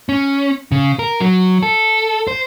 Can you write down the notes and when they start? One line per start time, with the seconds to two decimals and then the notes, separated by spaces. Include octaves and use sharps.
0.09 C#4
0.72 C#3
0.99 A#4
1.20 F#3
1.63 A4
2.27 C5